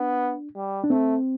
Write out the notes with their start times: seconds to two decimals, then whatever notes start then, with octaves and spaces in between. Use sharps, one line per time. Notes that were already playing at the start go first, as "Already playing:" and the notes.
Already playing: B3 D4
0.55 G3
0.84 D4
0.90 A3 C4